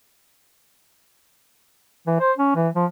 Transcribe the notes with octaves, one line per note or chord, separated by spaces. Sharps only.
E3
C5
C#4
E3
F3